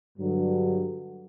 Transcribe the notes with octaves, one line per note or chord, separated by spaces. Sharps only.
G2 D3 F#3